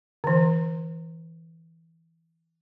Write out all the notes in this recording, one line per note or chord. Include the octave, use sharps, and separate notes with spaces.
D3 E3